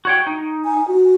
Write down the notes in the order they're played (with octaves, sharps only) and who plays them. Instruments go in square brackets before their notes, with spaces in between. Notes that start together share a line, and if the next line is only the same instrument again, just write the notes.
[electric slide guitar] F#4 C#5 G5
D#4
[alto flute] G#5
F#4